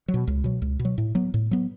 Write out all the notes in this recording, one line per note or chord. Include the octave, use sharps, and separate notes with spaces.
F#3
B2
C#2
B2 F#3
C#2
B2
F#3
A2
F#3 B3
A2
F#3 B3